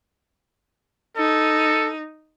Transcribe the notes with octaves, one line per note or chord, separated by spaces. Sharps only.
D#4 A4